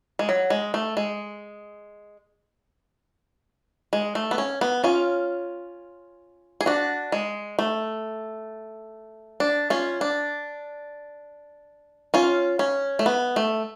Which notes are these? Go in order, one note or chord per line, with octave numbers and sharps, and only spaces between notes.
G#3
F#3
G#3
A3
G#3
G#3
A3
B3
C#4
B3
C#4 F4
G#4
D4 F#4
G#3
A3
D4
C#4 F4
D4
C#4 F4
C#4
A3
B3
A3